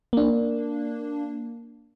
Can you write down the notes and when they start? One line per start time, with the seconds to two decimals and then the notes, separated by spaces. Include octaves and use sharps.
0.13 A#3 D4